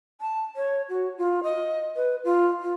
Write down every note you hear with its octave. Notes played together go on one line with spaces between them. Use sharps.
A5
C#5
F#4
F4
D#5
B4
F4
F4